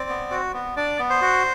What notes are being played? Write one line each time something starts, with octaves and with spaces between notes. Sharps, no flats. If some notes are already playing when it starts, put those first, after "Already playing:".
Already playing: C4 D5
B3
F#4
B3
D4 D5
B3
C5
F#4